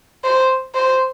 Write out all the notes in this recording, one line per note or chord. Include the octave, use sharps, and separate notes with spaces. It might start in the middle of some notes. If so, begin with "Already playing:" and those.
C5
C5